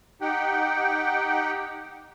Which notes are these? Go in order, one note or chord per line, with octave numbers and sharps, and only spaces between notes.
D#4 G4 F#5 G5